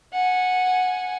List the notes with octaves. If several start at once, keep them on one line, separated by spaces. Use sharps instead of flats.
F#5 G#5